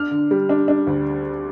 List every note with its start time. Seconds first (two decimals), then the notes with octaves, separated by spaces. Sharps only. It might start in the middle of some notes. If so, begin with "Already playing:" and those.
Already playing: D4 F6
0.11 D3
0.31 G3
0.49 D4
0.68 D4
0.87 D2